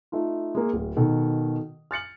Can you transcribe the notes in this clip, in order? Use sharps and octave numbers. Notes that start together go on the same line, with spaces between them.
A3 D#4 F4
G#3 A#3
D1
B2 D#3 A4
F6 A6 C#7 F#7